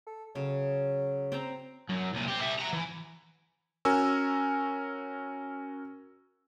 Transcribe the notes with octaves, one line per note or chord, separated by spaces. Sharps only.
A4
C#3 F#3
C4 C5 A#5
F#2
C2 A#2
C4 G4
G3 E5
F#5 A#5
E3
C#4 F#4 A#4 G#5 E6